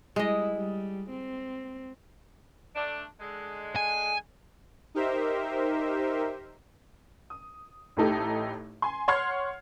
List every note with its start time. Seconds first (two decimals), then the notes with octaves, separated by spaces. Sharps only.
0.16 G3 G#3 E4 D#5
0.55 G3
1.11 C4
2.76 A3 D4
3.20 D3 G#3
3.76 G#5
4.95 D#4 G4 A#4 C5 E5
7.30 D#6
7.97 A1 A2 A3 D#4 G4 A4
8.82 G#5 C6
9.08 C#5 F#5 C6 F6 G#6 C7